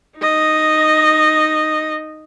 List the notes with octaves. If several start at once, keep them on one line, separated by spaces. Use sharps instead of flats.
D#4 D#5